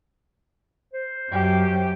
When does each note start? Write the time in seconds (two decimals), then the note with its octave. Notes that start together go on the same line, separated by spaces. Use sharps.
0.93 C5
1.31 F#2 G4